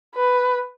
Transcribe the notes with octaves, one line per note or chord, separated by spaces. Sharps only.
B4